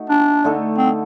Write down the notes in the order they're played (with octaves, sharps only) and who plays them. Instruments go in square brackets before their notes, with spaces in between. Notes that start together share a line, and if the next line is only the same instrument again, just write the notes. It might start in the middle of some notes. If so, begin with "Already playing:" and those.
Already playing: [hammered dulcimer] A3 D#4 F#4
[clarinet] D4
[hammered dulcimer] D3 A3 D#4 A4
[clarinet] C4